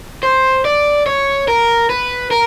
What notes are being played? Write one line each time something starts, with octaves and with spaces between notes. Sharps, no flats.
C5
D5
C#5
A#4
B4
A#4